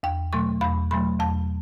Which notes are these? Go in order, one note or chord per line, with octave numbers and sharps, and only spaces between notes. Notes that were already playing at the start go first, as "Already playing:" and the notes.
E2 G5
B2 F#3 A3 C#6
E2 B5
B2 F#3 A3 B5
E2 A5